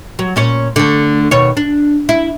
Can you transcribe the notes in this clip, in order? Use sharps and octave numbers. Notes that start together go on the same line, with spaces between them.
F#3
A#2 C#4 C#5
D3 A3
D#2 B2 C#5
D4
E4